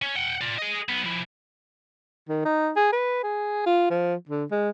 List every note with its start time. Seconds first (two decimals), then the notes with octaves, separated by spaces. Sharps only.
0.02 C#4
0.15 F#5 G5
0.41 F4 D5
0.58 G#4 D#5
0.88 B1 B3
1.04 F3 E4
2.29 D#3
2.45 D#4
2.76 G#4
2.92 B4
3.23 G#4
3.66 F4
3.90 F3
4.29 D3
4.51 G#3